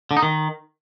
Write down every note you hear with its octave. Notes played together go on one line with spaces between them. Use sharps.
D3
D#4
D#3